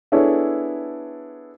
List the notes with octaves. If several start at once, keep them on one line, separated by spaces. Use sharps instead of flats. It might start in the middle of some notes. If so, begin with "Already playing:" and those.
B3 D4 E4 G#4 A4 C#5